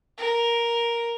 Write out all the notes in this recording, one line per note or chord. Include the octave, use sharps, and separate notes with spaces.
A#4